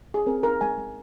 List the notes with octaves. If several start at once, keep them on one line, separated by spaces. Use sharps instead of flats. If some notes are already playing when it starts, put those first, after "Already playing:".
G#4
C4 A#4
D#4 A#4
G#3 G#5
G#3